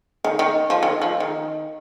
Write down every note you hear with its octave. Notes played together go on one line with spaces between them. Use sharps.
D#3
D#3
F3
D#3
F3
D#3